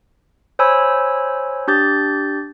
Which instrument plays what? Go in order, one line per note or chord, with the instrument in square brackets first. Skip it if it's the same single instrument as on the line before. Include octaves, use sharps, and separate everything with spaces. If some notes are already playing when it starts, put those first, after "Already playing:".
[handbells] C5 C#5 G#5 B5 E6
D4 G4 G6 A6